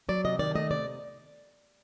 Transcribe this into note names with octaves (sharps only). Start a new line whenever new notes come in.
F#3 D5
C3 D#5
D#3 D5
A3 D#5
C3 D5